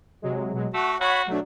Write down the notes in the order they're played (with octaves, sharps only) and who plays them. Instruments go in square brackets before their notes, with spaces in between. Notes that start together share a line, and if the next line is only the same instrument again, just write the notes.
[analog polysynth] C3 F#3 G#3
B2 F#3 G#3
[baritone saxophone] A3 [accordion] F#4 [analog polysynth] F#5
[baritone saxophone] F#4 [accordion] C#5 B5
[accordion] B2 A3 [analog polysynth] F#3 D4